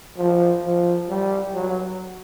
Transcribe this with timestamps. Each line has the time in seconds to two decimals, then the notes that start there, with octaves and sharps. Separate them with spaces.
0.17 F3
0.63 F3
1.09 G3
1.54 F#3